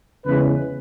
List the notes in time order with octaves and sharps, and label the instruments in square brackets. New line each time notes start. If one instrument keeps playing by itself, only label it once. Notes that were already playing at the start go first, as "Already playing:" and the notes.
[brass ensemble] E2 C#3 E3 G#3 B4